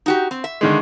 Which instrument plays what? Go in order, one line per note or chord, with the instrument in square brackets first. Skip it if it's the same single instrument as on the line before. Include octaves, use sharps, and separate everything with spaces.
[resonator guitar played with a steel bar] D#4 F#4 G4
C4
E5
[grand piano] D3 D#3 G#3